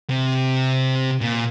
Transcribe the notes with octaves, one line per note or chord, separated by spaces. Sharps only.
C3
A#2